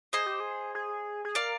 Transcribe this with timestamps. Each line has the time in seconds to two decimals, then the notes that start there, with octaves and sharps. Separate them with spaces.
0.13 G#4 C5 D#5
0.26 G4
0.40 G#4
0.75 G#4
1.25 G#4
1.35 A#4 D5 F5